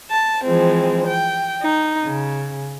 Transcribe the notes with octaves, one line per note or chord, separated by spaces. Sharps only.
A5
E3 F3 G#3 C4
G5
D#4
C#3